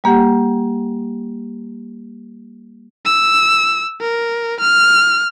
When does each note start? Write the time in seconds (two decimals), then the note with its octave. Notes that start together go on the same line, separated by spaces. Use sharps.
0.04 G3 A#3 G4 F#5
3.06 E6
4.01 A#4
4.60 F6